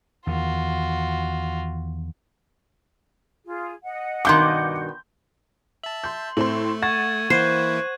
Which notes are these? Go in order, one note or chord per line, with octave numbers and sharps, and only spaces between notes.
E2 D#3 F4 F#4
F4 G#4
D#5 F#5
G2 B2 D#3 G#5 C6 D6 G6
E5 A5 F#7
C6 G6
A2 A3 C4 C6 F#7
F#5 C#6 G#6 A6 E7
E3 A#3 E4 C5 F#6 G#6 D#7